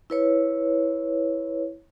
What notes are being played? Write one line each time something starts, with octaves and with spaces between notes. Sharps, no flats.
E4 B4 C#5